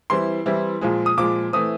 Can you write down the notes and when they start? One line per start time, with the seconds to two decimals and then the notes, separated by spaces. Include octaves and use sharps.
0.10 E3 G3 C4 E4 C6
0.46 E3 G3 C4 E4
0.81 A#2 F3 G#3
1.06 D#6
1.17 A#2 F3 G#3 D6
1.53 E3 A3 C4 D#6